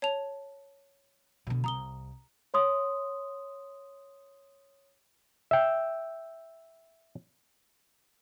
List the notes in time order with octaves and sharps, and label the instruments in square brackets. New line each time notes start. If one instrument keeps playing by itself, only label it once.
[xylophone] C#5 A5 F7
[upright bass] B2 D3
[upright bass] C2 [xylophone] A#5 D#6 G7
[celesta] C#5 C6 D#6
[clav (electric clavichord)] E5 G5